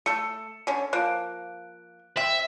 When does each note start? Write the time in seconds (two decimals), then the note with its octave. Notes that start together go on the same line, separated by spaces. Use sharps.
0.06 A3 A4 C#7
0.67 D3 C#4
0.93 F3 A#3 F#6 D7
2.17 C4 E5